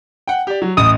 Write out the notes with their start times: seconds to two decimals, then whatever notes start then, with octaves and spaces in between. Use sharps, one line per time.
0.27 F#5 G5
0.47 G4 D5
0.62 F#3
0.77 A1 D#5 D#6 D#7